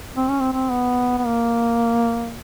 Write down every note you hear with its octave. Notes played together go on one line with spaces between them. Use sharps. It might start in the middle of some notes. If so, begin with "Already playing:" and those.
C4
C#4
C4
C4
B3
B3
A#3